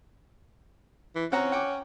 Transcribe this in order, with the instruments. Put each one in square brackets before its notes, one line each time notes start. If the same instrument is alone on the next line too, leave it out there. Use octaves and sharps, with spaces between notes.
[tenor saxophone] E3
[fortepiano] C4 F#5 A#5 [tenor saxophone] C#4
[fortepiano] F#5 G5 D6